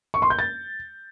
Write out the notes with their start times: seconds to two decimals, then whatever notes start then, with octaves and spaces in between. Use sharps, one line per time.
0.14 C#6
0.22 C6
0.30 G6
0.39 A6